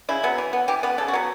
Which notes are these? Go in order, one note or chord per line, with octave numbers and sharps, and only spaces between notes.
C#3 E4
F#3 B3
E3
B3
E3 G4
B3 B4
C#3 A4
F#4
F#3 B3